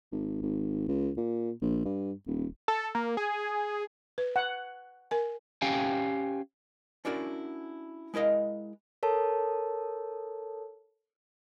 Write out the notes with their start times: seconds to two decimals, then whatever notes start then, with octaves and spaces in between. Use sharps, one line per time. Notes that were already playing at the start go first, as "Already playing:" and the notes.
0.12 G#1
0.42 G#1
0.88 C#2
1.17 A#2
1.62 A#1
1.85 G2
2.27 D#1
2.68 A4
2.95 A#3
3.17 G#4
4.18 B4
4.36 F#5
5.11 A#4 G#5
5.62 C#4 G4 F5 G5 G#5
7.05 C#4 D4 E4 F#4 A#4 D5
8.14 G#3 E4 A#4 D#5 F5
9.03 A4 A#4 C#5 A5